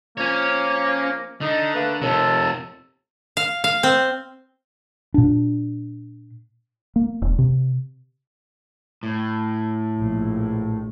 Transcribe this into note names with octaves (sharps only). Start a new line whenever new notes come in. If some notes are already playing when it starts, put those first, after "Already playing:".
F3 A#3 C#4 C#5
D3 D#4
A3 A#3 B4
D#2 C3 F3 A4
F5
F5
C4
A#2 D4
A#3
E1
C3
A2
A#1